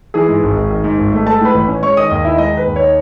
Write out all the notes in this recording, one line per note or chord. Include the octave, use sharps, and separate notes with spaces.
E3 G#4 G#5
G#2
G#1
G#1
D#3
G#2
G#1
A3
G#3 A4 A5
A2 B4 B5
A1
C#4
G#3 C#5 C#6
D#3 D#5 D#6
D#2 D#5 D#6
D#4 E4 E5
G#3 D#4 D#5
D#3 B4
D#2
D#4 C#5